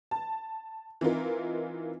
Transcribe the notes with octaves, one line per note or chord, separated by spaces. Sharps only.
A5
E3 C4 D#4 F4 A#4